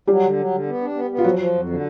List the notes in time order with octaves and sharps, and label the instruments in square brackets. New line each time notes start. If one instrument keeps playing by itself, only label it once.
[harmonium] F#3 [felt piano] G3 G4
[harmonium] D3
F#3
D3
B3
D4
B3
B3
[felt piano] F4
[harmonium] F3 [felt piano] F#3 F#4
[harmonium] F3
F2
D3